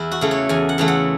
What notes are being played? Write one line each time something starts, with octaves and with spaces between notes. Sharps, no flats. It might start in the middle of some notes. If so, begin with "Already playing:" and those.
Already playing: E2 E4
F#4
C#3 E3 A3
C#5
E2 G#5
F#5
C#3 E3 A3
F#5